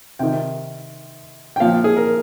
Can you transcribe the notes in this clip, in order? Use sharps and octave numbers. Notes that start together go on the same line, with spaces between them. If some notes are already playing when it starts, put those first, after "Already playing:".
C3 D#3 G5
G5
A#2 F3 F5
G#4
A#4